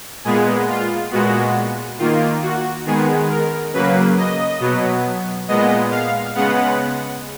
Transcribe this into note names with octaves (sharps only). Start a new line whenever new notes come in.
A#2 G#3 B3 G#4
F4
A#2 G#3 B3 F#4
D#3 A#3 F4
F#4
D#3 G#3 B3 G#4
A#4
C#3 F#3 A#3 B4
D#5
B2 F#3 B3
A#2 G#3 B3 D#5
F5
C#3 G#3 B3 F#5